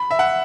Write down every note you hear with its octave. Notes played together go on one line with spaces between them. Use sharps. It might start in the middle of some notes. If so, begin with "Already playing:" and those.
Already playing: B5
E5
F#5